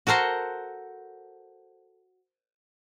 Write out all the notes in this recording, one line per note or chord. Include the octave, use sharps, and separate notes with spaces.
F#4 A4 A#4 C5 F#5